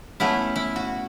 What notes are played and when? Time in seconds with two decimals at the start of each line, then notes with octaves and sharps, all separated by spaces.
0.20 A3 B3 C#4 E4
0.56 E4
0.76 F#4